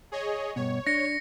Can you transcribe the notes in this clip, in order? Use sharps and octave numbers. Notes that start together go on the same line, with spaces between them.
G#4 C#5 D#5
G2 B2 C#5
D4 A#6 C#7